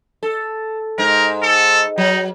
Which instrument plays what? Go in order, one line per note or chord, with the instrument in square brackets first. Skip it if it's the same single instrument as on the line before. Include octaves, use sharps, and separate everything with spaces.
[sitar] A4
[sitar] G#2 [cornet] A#4
[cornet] A4
[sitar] F#3 [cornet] D#4